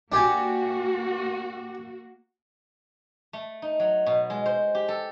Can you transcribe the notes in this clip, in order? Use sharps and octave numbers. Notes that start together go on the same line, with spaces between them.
A#3 D4 F#4 G4 G#5
A3
D#4
F#3
B2
G#3
C5
G4
A4